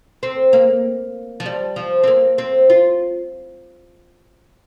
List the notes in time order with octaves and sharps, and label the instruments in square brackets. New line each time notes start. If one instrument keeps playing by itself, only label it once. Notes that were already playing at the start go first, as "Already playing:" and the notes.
[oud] C4
A#3
F3
G3
F3
C4
A#3
C4
F4